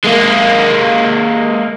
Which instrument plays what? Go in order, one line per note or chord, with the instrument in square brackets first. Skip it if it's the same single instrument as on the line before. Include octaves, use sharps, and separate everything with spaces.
[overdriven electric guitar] G#3 A#3